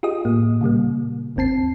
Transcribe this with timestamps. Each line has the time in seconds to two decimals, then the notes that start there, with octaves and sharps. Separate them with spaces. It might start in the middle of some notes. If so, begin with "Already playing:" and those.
0.03 F4 G4 G#4 D#5 D#6
0.25 A2 A#3
0.61 A#2 C#3 G3 A#3
1.36 G1 D#2 C4 A5 C7